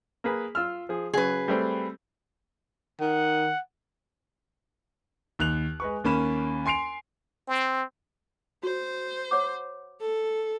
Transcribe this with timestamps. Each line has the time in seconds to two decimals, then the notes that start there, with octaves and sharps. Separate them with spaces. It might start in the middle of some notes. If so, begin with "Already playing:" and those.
0.24 A#3 G#4 B4
0.55 F4 E6 F6
0.89 F3 G#4
1.13 C#3 F#3 G#4 B4
1.48 G3 A3 C4
3.01 D#3 F#5
5.39 D#2 F#6 F7
5.80 G#3 B4 C#6
6.04 D#2 A#3 C#4 B5 E7
6.66 G#5 C6 C7 D7 F7
7.47 C4
8.63 F#4 C5
9.31 C#5 F#5 D6
10.00 A4